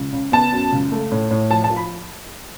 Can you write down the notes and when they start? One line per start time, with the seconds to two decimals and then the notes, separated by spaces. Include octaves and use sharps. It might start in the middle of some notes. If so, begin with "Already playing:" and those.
Already playing: C#2
0.13 C#3
0.32 B3 A5
0.52 F#2
0.72 C#2
0.92 A3
1.12 A2
1.31 A2
1.50 F3 A5
1.64 A5
1.70 F3
1.76 B5